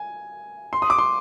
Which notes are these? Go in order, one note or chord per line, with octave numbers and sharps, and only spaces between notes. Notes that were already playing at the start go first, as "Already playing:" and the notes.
Already playing: G#5
C6
D#6
D6
C6